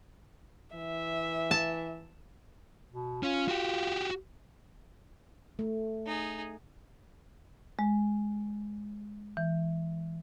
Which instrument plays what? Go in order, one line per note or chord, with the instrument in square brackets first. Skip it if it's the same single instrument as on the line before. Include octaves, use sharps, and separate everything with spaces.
[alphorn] E3 [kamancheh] E5
[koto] A5
[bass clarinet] B2
[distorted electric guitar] C#4 [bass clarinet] F4
[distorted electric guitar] F#4 G4
[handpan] A3
[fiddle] D#4 G#4
[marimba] G#3
E3